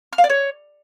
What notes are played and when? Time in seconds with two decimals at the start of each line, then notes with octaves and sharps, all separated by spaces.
0.13 F6
0.18 F5
0.24 D5
0.30 C#5